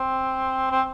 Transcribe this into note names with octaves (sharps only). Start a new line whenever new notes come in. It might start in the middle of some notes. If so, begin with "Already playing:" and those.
Already playing: C4
C4